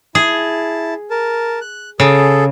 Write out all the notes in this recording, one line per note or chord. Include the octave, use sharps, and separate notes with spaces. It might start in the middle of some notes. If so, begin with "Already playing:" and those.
E4 G#4 A5
A#4 A5
F#6
C#3 G#4 A4